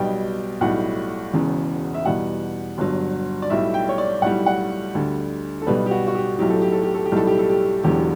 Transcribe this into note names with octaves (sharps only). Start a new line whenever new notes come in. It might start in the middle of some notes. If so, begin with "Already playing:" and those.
Already playing: B1 B2 G3 G5
B1 A2 G3 F#5
E1 E2 C#3
E5
E2 B2 G3 F#5
G1 G2 F#3
D5
B1 A2 G3 E5
G5
C#5
D5
B1 A2 G3 F#5
F#5
D2 D3 G3
A4
B1 B2 G3 B4
G4
F#4
F#4
G4
B1 A2 F#3 G4
A4
G4
A4
G4
A4
G4
B1 A2 G3 A4
G4
A4
G4
E1 E2 D3 F#3 G4